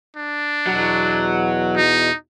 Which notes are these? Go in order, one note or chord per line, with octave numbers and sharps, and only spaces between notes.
D4
E2 B2 F#3
D#4